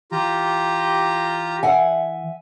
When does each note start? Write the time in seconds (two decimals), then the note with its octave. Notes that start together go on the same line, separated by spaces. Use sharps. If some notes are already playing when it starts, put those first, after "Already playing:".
0.12 E3 F4 G4 A#5
1.63 E5 F#5 G#5